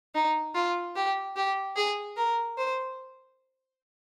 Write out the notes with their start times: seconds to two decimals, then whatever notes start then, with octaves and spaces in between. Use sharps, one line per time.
0.15 D#4
0.55 F4
0.96 G4
1.36 G4
1.76 G#4
2.17 A#4
2.58 C5